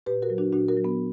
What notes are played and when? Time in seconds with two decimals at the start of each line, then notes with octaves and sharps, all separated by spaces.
0.06 A#2 G4 B4
0.22 F#4 A#4
0.30 F#3
0.38 D4 F#4
0.53 A#2 D4 F#4
0.68 F#4 A#4
0.77 F#3
0.84 B3